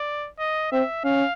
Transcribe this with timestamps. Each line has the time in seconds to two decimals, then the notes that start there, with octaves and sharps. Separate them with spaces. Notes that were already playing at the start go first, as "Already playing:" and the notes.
Already playing: D5
0.39 D#5
0.72 C4 E5
1.04 C#4 F5